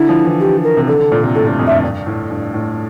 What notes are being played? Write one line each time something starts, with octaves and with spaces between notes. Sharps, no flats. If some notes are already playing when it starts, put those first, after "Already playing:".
Already playing: D3 E4
F3
E3
G4
A#4
C3
D3 A4
D3
A#2
C3
A2 A4
G2
F2
G2 E5
G2
A2
G2
A2